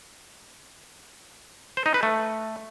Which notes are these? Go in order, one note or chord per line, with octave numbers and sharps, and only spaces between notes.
C5
D#4
B4
A3